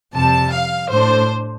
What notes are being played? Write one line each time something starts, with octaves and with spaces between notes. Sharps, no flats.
F2 C3 G3 A5
F5
A2 A3 D4 C5